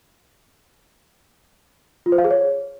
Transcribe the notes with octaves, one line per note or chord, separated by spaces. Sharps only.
F4
C5
F5
G#4
C#5